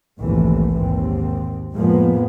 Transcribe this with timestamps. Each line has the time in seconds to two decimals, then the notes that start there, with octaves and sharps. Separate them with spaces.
0.19 A#1 D#2 G#2 C3 E3 A3
0.78 D#2 G#2 C4
1.74 F1 A2 F3 G#3 A#3 B3